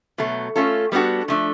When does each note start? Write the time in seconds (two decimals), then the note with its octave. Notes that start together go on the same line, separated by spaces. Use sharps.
0.18 B2 F#3 A3
0.56 A3 C#4 F4 A4
0.92 G3 B3 D4 F#4 A4
1.28 F3 A3 D4